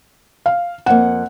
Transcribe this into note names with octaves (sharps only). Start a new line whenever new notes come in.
F5
F2 A#3 F#5